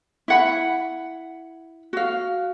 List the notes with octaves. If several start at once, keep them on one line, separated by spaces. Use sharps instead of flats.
E4 F#5 B5
F#4 F5